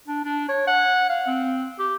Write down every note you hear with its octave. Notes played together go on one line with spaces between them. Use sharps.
D4
D4
C#5
F#5
F5
C4
G4